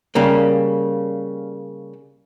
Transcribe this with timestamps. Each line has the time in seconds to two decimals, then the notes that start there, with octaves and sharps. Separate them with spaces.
0.15 C#3 G3 A#3